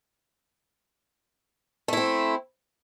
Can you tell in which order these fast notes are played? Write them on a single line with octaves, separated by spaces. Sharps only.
A3 E4 C4